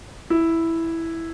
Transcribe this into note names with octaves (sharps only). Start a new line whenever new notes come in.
E4